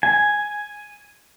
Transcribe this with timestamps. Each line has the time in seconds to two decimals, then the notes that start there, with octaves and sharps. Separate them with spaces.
0.03 G#5